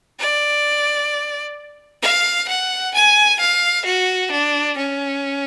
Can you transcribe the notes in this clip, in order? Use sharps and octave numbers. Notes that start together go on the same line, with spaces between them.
D5
F5
F#5
G#5
F5
F#4
D4
C#4